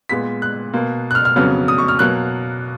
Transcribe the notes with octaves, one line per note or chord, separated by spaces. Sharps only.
A#2 G#3 B3 B6
F#6
B2 A#3
F#6
F6
F6
F2 C#3 F#3 B3 F6
D#6
C#6
F6
B2 F#3 A#3 F#6